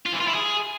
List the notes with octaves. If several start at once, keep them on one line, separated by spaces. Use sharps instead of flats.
F4
E3
F4
E4
G#4